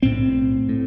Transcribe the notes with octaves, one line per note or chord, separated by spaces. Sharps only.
B1 A2 C4
A2